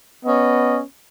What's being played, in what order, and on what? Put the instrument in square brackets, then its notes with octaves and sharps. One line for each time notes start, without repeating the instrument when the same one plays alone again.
[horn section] B3 C#4 D#5